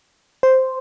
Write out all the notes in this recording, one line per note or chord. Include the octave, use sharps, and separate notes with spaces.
C5